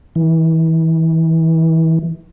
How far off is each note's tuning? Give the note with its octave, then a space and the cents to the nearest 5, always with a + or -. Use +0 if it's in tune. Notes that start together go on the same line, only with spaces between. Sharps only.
E3 -30